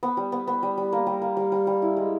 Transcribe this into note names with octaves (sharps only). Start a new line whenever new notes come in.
B3
G3
B3
B3
G3
G3
A#3
G3
A#3
G3
G3
G3
E4
G#3